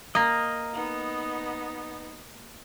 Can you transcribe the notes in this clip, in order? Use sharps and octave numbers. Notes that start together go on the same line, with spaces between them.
A#3 D#5 A#5
B3 D#4